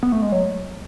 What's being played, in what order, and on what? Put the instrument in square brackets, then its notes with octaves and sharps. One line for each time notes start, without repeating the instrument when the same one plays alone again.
[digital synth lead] B3
A3
G#3
F#3